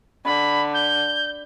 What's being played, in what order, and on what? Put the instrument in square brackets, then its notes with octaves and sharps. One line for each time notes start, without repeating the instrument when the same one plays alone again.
[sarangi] D3 [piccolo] B5
[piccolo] G6